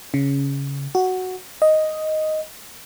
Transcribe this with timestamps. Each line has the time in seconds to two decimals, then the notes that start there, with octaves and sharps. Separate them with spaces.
0.14 C#3
0.95 F#4
1.62 D#5